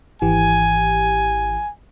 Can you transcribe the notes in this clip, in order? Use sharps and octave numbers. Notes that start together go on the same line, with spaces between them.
G#1 E3 G4 G#5